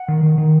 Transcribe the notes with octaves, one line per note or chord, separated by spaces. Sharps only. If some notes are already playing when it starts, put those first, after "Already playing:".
Already playing: F#5
D#3
D#3
D#3